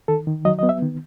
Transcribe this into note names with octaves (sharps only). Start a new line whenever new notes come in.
D#3 A4
D#3
F#3 D#5
B3 D#5
E5
D#3